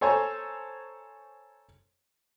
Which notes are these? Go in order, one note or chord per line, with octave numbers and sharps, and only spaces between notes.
A4 C5 C#5 G#5 A#5